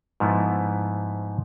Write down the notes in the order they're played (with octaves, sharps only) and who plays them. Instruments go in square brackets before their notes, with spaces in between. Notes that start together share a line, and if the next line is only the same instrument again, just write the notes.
[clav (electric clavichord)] G#2 F3 A3 B3 E4